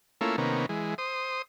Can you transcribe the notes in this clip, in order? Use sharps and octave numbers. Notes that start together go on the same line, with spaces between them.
A3 A#3 C#4 E4 F4
C3 D#3 A#3 B3 C#4
E3 G#3
C5 D#6